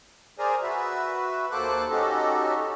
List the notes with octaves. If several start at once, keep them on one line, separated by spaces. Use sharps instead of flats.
G#4 A#4 C5 D5 G#5 A#5
F#4 B4 E5
D#2 A#3 A4 C5 D6 F#6
C#4 D#4 F#4 G4 A4 D#5